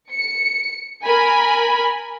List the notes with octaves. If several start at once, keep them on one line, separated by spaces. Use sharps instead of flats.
C#7
A#4 G#5 B5